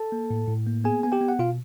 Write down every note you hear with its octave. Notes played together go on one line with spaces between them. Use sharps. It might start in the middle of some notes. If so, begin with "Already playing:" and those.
Already playing: A4 A5
A#3
A2
A2
A#3
B3 G#4 G#5
B3 G#5
G4 G5
B3
F#5
B2 F4 F5